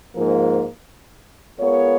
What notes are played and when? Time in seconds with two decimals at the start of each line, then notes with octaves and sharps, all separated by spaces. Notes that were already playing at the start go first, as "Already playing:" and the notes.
0.15 G#2 F3 A#3
1.58 G#3 B3 F4 A#4 C#5